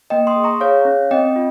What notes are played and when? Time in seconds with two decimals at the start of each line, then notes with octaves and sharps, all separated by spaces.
0.10 A#3 D#5 G5
0.27 C6 D#6
0.36 G#4
0.44 A#5 C#6
0.60 G#4 C#5 F5
0.85 C#4
1.11 C4 D#5 G5
1.36 F4